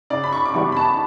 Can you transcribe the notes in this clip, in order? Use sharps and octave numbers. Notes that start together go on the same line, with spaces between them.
C#3 D5
B5
C#6
D6
E3 G3 B3 D4 C#6
B5
A5